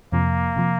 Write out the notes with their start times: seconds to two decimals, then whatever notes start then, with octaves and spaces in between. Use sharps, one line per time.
0.12 F2 C3 F3 A#3
0.56 C3 F3